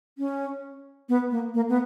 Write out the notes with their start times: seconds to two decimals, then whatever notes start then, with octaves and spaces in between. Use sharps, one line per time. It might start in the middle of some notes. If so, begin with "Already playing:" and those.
0.18 C#4
1.09 B3
1.31 A#3
1.54 A#3
1.69 B3